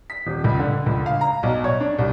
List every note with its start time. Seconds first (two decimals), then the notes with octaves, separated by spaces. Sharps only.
0.10 B6
0.27 D#1
0.44 C#2
0.59 D3
0.86 C#2
1.06 F5
1.21 A#5
1.43 B1
1.64 C#5
1.80 D4
1.99 C2